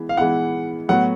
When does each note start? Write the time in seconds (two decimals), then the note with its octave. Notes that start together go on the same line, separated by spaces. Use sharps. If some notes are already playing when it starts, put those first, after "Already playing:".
Already playing: E3 G#3 B3
0.09 F5
0.17 E3 G#3 B3 E4 F#5
0.89 A2 F#3 B3 F#5